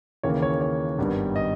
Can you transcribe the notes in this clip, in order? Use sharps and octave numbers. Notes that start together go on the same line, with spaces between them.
D#2 C#3 E3 A#3 C#5
C#5
C#5
G#1 G2 G3 B3
D#5